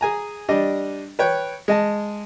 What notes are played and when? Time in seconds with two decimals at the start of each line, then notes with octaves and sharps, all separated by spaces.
0.01 G#4 G#5 A#5
0.49 G3 D4 D#5
1.19 B4 C#5 G5
1.68 G#3 D#5 A5